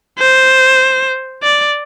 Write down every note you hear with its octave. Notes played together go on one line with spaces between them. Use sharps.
C5
D5